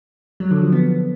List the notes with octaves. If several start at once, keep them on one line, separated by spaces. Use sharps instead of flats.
F#3
D3
F3
B3